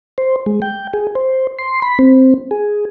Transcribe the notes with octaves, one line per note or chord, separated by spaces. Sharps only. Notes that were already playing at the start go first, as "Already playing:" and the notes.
C5
G#3
G5
G#4
C5
C6
B5
C4
G#4